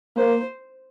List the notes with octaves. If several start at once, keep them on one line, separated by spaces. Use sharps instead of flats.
A#3 C5